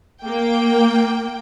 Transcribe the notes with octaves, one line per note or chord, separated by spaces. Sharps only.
A#3 G5